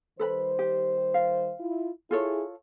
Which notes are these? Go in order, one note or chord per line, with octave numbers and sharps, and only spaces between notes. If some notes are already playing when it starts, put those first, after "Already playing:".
D#3 G3 A4 B4 C5 B5
G4
F5
E4 F4
E4 F4 G#4 A4 C#5